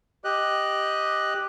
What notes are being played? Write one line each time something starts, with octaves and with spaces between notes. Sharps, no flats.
G4 D#5 F#6